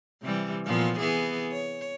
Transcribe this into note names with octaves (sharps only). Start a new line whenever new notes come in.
C3 E3 G3
A#2 F3 B3
E3 B3 G#4
C#5